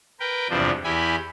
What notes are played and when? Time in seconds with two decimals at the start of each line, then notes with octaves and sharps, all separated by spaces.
0.20 A#4 B4 G5
0.50 E2 G2 C3 F3 D4
0.84 E2 E4 G4 G#5 B5